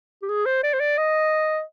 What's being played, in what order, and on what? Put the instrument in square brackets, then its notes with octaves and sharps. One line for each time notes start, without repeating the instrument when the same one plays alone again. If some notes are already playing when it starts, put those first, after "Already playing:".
[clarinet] G4
G#4
C5
D5
C5
D5
D#5